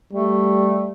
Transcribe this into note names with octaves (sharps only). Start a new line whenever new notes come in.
G3 A3